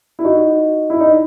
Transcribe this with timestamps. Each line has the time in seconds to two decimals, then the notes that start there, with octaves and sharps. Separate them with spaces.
0.19 E4
0.24 D#4 F#4
0.90 E4
1.00 D#4